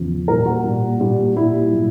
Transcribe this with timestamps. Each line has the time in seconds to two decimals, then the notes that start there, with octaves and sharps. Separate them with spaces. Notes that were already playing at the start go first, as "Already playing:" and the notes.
Already playing: E2 C#3 F3
0.28 A#2 G3 A#4
0.46 F#4
0.64 A#2 G3
1.00 A#2 G3
1.36 A#2 G3 E4
1.73 A#2 F#3